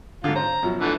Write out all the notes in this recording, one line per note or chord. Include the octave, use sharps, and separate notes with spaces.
G#2 D3 F4
C5 A#5
F#2 B2 F3
D3 E3 A3